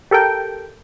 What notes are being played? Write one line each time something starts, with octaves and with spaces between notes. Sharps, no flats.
G4 A4 A#4 G5